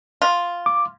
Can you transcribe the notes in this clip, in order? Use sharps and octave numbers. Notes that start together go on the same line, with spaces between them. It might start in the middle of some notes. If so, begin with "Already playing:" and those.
F4
D6